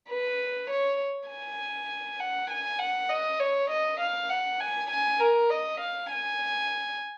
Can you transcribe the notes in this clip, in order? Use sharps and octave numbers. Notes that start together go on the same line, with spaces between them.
B4
C#5
G#5
F#5
G#5
F#5
D#5
C#5
D#5
F5
F#5
G#5
G#5
A#4
D#5
F5
G#5